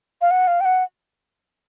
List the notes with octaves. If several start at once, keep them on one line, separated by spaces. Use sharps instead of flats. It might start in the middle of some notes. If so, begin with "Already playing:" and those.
F5
F#5
F5
G5
F#5